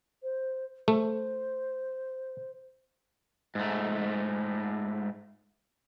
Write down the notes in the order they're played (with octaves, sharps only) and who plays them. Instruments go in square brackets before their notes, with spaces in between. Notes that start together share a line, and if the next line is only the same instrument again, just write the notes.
[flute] C5
[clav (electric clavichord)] A3 [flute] C5
[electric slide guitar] G#2 A3